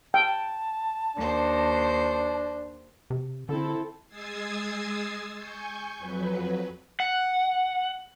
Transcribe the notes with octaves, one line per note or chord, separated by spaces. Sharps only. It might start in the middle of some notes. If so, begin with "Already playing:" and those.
G5 A5
D#2 D4 C5
C3
D3 C4 E4 A4
G#3 D#6 E6 G#6 A6 C7
G#5 C#6 G6
F2 F#3 B4
F#5